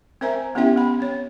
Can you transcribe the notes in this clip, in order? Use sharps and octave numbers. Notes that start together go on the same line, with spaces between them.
C4 A#4 C5 E5 G#5 A#5
B3 C#4 E4 G4 E5 G5
B3 B5
C4 C#5